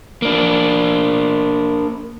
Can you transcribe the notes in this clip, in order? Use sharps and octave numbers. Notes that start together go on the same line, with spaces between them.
A#3 D4